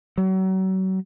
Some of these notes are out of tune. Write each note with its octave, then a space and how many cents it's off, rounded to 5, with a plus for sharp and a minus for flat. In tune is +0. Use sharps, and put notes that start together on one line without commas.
F#3 +35